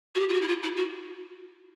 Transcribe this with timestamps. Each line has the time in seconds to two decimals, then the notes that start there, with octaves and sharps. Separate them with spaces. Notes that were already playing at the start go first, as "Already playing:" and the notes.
0.15 F#4
0.19 G4
0.28 F4
0.33 F#4
0.41 E4
0.47 F4
0.62 E4
0.76 F#4